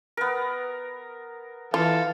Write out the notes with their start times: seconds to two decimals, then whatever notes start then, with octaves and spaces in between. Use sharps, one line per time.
0.17 B3 A#4
1.74 E3 F4 A4 F5